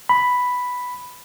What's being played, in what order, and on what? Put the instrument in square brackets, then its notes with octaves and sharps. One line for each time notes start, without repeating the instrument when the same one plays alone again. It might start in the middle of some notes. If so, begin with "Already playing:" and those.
[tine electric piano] B5